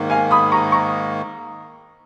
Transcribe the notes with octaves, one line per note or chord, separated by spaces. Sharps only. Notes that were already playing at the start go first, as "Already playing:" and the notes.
Already playing: G#2 D#3 A#3
F5 G#5
B5 D#6
A#5 C#6
A#5 C#6